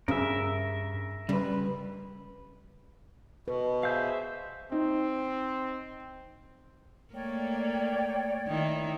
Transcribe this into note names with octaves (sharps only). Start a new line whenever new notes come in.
G2 C#3 A#4 E5
C#3 G3 B4
B2 B4
G#4 C5 E5 F5 G6
C4 D#4
A3 A#3 C#5 D5 G5
D#3 D#4 E4